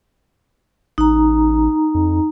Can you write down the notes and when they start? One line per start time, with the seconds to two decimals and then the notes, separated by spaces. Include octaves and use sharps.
0.98 A1 D#4 A#5
1.94 F2